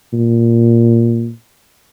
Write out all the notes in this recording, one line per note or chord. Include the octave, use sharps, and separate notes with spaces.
A#2